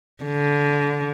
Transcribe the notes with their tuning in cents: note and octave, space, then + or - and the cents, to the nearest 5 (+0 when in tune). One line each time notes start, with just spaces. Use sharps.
D3 -25